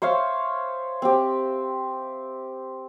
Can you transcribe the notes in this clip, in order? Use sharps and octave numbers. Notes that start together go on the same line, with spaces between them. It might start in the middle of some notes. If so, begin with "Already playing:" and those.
C5 C#5 E5 F5
C4 G4